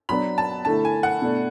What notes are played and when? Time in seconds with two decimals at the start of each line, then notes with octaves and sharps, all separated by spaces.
0.09 F#3 B3 D4 B5
0.38 A5
0.65 D3 A3 E4 A5
0.85 G#5
1.03 F#5
1.22 B2 A3 D4